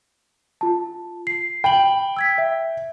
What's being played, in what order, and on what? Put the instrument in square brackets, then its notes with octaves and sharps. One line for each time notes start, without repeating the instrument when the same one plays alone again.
[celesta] F4 A5
C7
[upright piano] G5 [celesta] B5 F#7
[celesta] E6 G#6 B6
E5